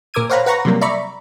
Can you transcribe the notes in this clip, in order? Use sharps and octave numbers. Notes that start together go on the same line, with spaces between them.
A#2 A#4 D6 E6 G#6 D#7
C5 C#5 F5 F#5 A#5 B5
B4 F#5 A#5 C#6 A#6
C3 F#3 G3 A#3
D5 E5 A#5 B5 C#6